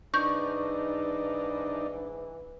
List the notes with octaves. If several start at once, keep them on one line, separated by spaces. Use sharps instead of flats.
G#2 E3 D4 D#4 C#6 G6